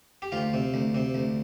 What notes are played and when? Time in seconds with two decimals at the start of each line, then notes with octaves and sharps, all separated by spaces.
0.22 G4
0.32 D2 F4
0.54 C3
0.74 D2
0.95 C3
1.14 D2